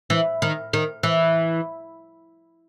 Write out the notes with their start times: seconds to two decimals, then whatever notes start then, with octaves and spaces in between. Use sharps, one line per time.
0.10 E3
0.42 D#3
0.73 D#3
1.03 E3